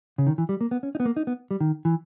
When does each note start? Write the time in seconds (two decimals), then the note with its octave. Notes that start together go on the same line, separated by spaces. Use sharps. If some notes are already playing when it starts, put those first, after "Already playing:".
0.18 C#3
0.27 D#3
0.38 E3
0.49 G3
0.61 A#3
0.71 B3
0.83 C#4
0.95 D#4
1.00 B3
1.06 A#3
1.17 D#4
1.27 B3
1.51 G3
1.60 D#3
1.85 E3